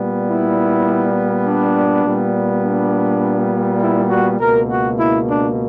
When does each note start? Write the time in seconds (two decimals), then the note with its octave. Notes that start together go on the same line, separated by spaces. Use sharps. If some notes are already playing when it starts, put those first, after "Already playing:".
Already playing: A#2 G3 B3
0.28 E4
1.45 D4
2.03 A#2 G3 B3
2.63 D4
3.81 E4
4.09 F#4
4.39 C#2 B2 A#3 A#4
4.69 F#4
4.99 E4
5.28 D4